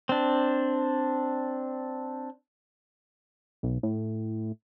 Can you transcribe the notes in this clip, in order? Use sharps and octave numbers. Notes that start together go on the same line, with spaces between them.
C4 D4
B1
A2